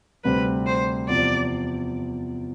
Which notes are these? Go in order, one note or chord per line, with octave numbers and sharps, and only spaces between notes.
D2 C3 G3 C4 B4
C5
E2 C3 F3 D5